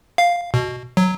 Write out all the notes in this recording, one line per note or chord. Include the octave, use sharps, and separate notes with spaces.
F5
B2
F#3